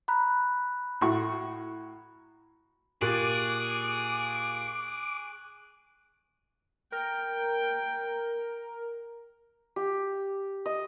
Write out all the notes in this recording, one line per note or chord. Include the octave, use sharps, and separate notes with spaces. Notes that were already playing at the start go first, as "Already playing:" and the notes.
A#5 B5 F#6
A2 F#4 C#6
A#2 G4 G#4 C#6 D6 F#6 A6 F#7
A#4 G5
G4
D#5